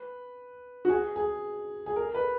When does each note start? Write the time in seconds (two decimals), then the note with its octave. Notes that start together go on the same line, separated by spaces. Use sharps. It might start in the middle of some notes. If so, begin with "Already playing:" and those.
Already playing: B4
0.85 F#4
0.89 G#4
1.16 G#4
1.86 G#4
1.96 A#4
2.15 B4